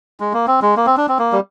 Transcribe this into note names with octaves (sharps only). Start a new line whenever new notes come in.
G#3
A#3
C4
G#3
A#3
C4
D4
C4
A#3
G3